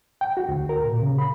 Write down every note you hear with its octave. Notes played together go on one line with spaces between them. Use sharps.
G5
F#4
D2
A#4
A#2
C#3
B5